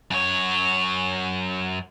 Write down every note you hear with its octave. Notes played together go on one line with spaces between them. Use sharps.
F#2 C#5